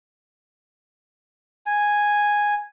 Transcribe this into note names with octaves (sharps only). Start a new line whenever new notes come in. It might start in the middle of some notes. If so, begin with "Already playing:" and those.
G#5